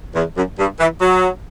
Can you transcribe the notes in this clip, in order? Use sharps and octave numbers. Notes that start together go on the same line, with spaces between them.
E2
F#2
G2
E3
F#3